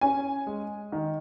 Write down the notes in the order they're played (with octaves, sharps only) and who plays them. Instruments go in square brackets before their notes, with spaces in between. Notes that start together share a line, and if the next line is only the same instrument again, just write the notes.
[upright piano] C#4 G#5
G#3
D#3